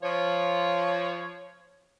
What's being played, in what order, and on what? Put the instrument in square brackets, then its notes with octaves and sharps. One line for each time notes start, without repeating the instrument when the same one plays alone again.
[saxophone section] F3 C#5